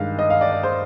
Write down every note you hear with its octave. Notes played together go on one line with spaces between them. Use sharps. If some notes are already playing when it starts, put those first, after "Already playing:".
Already playing: G2 D#3 G#3 F5
D#5
F5
D5
D5
C5